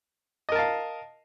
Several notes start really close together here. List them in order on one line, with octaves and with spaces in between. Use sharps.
D#5 A#4 A5 F5